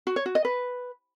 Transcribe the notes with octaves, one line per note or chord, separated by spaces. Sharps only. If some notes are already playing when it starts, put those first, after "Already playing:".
F#4
C#5
F#4
D#5
B4